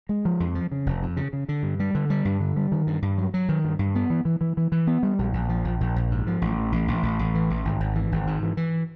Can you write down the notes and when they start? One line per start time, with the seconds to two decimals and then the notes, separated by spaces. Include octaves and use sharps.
0.09 G#3
0.25 F3
0.40 F2
0.55 F3
0.72 C#3
0.86 F1
1.02 F2
1.17 C#3
1.33 C#3
1.49 D3
1.63 G2
1.80 G3
1.95 D3
2.10 G3
2.25 G2
2.40 D3
2.57 G3
2.72 D#3
2.87 G2
3.02 G2
3.18 F#3
3.34 F#3
3.49 D#3
3.65 G2
3.79 G2
3.95 B3
4.10 E3
4.25 E3
4.41 E3
4.57 E3
4.72 E3
4.87 B3
5.03 G3
5.19 A#1
5.33 A#1
5.49 F3
5.64 A#1
5.81 A#1
5.96 A#1
6.11 G#2
6.27 F3
6.42 A1
6.58 E3
6.72 A1
6.88 A1
7.03 A1
7.19 A1
7.35 E3
7.50 A1
7.65 G#1
7.80 G#1
7.95 E3
8.12 G#1
8.27 G#2
8.43 E3
8.57 E3